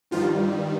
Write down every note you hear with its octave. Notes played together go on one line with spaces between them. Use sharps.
G2 D#3 F3 G3 F4